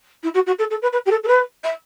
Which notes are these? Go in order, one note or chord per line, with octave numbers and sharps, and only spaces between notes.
E4
F#4
F#4
A4
A4
B4
B4
G4
A4
A4
B4
E5